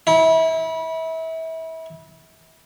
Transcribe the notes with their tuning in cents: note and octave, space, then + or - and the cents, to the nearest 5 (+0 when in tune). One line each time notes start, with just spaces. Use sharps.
E4 -30